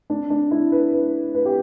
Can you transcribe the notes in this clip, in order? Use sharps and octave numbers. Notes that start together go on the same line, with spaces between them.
D4
D4
E4
B4
B4
B4
G4